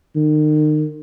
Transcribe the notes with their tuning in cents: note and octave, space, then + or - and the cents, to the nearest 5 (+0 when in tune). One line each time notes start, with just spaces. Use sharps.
D#3 -35